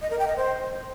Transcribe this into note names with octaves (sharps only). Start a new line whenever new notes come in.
D#5
A#4
G5
D#5
C5